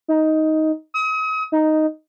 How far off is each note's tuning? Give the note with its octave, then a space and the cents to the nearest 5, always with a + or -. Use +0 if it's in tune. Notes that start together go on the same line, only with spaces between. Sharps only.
D#4 +10
D#6 +40
D#4 +0